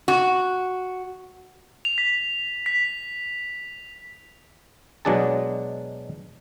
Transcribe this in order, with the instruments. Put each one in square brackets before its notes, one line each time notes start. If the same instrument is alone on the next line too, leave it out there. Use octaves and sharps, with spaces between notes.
[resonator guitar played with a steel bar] F#4
[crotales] F7
B6
B6
[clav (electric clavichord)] B2 F#3 G#3 D4 G#4 A5